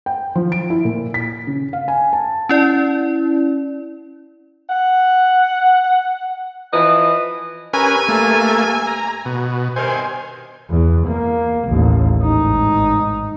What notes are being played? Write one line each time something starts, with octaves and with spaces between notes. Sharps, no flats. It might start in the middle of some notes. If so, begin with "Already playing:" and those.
G5
F3
D7
E4
A#2
B6
C#3
F5
G#5
A5
C#4 E4 D5
F#5
E3 F3 B4 D#5
G2 C#4 A#4 B4 E5 G#5
A3 A#3
A#5
B2
G2 C3 D#3 C5 G#5
E2
A#3
A1 D#2
G#1 D#4